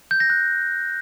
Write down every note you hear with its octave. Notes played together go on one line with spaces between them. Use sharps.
G6
A#6
F#6